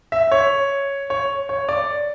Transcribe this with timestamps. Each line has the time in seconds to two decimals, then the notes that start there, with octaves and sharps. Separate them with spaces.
0.12 E5
0.31 C#5
1.10 C#5
1.49 C#5
1.69 D5